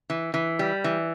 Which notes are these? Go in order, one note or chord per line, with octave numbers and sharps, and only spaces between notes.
E3
E3
G3
E3